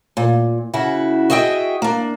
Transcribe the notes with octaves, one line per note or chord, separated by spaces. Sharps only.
A#2
C#3 E4 F#4
F#4 G#4 D#5 E5 G5
A#3 D4